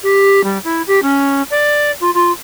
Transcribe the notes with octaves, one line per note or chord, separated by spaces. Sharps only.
G4
G3
E4
G4
C#4
D5
F4
F4